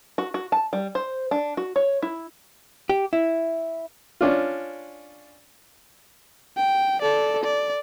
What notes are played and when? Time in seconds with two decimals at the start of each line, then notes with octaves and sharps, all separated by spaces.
0.18 F#4
0.34 F#4
0.52 A5
0.73 G3
0.95 C5
1.31 D4
1.57 F#4
1.76 C#5
2.02 E4
2.90 G4
3.13 E4
4.21 C#4 D4 F4
6.58 G5
7.02 A4 D5
7.44 D5